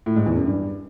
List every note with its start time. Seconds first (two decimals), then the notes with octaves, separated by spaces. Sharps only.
0.06 A2
0.16 G#2
0.26 E2
0.36 F#2
0.46 G2